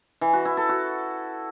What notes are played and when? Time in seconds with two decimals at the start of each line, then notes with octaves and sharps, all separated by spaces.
0.21 E3
0.33 F#4
0.45 E4
0.57 A4
0.69 F#4